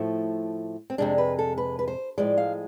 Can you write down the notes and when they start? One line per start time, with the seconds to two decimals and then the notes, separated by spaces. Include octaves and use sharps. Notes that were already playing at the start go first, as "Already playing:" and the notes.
Already playing: A2 F3 A3
0.90 C4
0.98 F2 C3 G#3 D4
1.18 B4
1.39 A4
1.58 B4
1.79 B4
1.88 C5
2.18 A2 F3 G#3 D5
2.38 F5